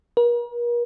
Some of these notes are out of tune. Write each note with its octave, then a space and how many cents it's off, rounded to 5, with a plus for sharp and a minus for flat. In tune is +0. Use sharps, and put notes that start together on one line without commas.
A#4 +40